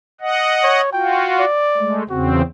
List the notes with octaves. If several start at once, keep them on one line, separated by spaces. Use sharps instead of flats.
D#5 F#5
C#5
F4 F#4 G5
D5
G#3 A3
E2 C#3 C4 F#4